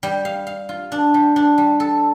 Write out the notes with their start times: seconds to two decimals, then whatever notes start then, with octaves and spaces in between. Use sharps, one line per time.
0.03 G3
0.25 F5
0.47 F5
0.69 F4
0.92 D4
1.14 G3
1.36 D4
1.58 G3
1.80 A4